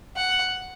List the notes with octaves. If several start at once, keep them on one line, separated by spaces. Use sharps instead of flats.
F#5